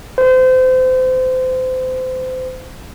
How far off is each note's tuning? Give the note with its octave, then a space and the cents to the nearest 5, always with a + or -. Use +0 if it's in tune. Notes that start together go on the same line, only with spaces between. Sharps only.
C5 -30